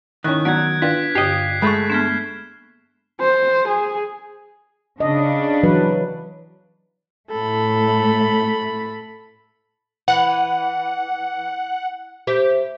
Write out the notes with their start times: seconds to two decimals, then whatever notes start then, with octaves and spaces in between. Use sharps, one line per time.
0.24 D#3 C#4 E4 C#6 F#6
0.45 F#3 B3 D5 A#5 G#6 D7
0.82 D4 F4 B4 G5 C6 B6
1.15 G2 D3 G4 D#5 C7
1.62 G#3 A3 B5 C#6
1.90 A#3 B3 D4 F6 G#6 E7
3.20 C5
3.68 G#4
5.00 C#3 D4 D#5
5.63 E3 F#3 B4
7.30 A2 A3 A4 B5
10.08 E3 F#5
12.27 G4 C5 E5